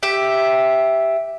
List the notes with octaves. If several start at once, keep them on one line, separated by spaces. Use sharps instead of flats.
G4 E5